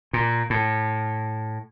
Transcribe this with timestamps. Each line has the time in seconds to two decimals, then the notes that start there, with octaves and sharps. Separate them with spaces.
0.13 A#2
0.50 A2